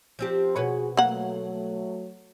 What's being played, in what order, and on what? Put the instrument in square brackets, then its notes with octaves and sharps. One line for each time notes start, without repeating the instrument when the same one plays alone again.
[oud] F3 C4 G4
[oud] B2 B4 C#5 [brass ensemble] F#4 G#4
[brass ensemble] F#3 A3 [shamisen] A#3 F#5